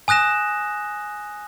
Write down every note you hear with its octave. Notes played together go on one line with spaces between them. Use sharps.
G#5 D#6 F#6 A#6 E7